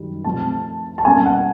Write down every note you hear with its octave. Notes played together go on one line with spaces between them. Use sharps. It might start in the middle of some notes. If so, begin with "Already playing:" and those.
Already playing: F#2 D#3 G3
C3 F3 A3 C4 A5
A5
B2 G3 A#3 C#4 G#5
F#5